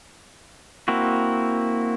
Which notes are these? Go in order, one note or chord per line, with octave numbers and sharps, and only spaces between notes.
A#3 C4 E4 F#4